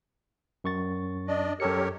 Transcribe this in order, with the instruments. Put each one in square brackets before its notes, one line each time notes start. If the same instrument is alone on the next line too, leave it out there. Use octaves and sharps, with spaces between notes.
[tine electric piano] F#2 C#6 A6
[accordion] D4 D5 D#5
[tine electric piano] F#2 A4 C#7 [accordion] G4 A#4 C#5